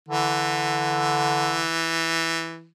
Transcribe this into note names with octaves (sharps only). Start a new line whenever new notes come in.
D3 E3